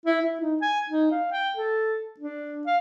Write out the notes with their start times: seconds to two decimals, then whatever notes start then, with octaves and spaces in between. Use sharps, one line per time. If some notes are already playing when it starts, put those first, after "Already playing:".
0.06 E4
0.22 E4
0.41 D#4
0.62 G#5
0.90 D#4
1.12 F5
1.32 G5
1.57 A4
2.20 D4
2.67 F5